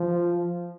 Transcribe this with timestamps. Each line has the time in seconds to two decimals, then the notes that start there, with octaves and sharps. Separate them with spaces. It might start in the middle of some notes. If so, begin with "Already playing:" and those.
Already playing: F3